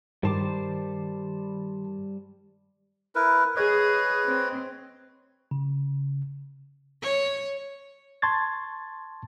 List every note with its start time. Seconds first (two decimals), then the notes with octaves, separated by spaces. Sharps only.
0.23 G2 D#3 G3 C5 A5 D6
3.15 E4 A#4 B4
3.56 G#4 B4 C#5 D#5
4.27 C4
5.51 C#3
7.01 C#5
8.22 A5 C6 C#6 G#6 A6